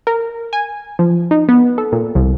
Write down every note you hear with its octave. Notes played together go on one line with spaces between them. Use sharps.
A#4
G#5
F3
D#4
B3
A4
A#2
C2